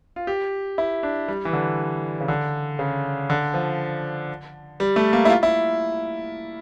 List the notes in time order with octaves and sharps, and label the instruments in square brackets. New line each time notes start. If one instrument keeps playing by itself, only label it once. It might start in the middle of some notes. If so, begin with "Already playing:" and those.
[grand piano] F4
G4
E4
D4
G3
E3
D3
C#3
D3
C#3
D3
F3
G3
A3
A#3
E4
F4
E4